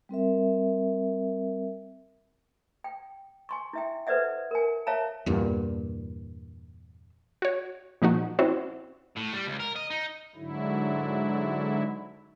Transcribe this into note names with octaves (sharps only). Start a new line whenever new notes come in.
G3 C4 A#4 E5
G5
G#5 C6 C#6
E4 E5 G5
A4 B4 C5 D5 E5 F#5
A#4 G#5
C#5 E5 F5 A5 A#5
E2 G2 A#2
F#4 C#5
A#2 F3 D#4 F#4
C4 C#4 E4 F#4
A2
G3
C#2
A#4
D#5
D#4
G#2 D3 F#3 E4